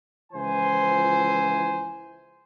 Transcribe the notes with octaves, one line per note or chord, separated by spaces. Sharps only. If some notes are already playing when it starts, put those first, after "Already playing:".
C#2 E3 F3 E4 C5 G#5